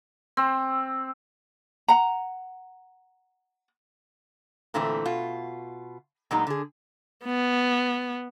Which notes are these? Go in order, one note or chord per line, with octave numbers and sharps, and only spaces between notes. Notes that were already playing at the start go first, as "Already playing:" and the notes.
C4
F#5 A#5
A#2 D3 E3 A3 C4 E4
B2 F4
A#2 F#3 G#3 B3 D#4
D3 G#4
B3